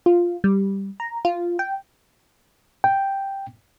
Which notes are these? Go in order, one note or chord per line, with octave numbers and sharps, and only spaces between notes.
F4
G3
A#5
F4
G5
G5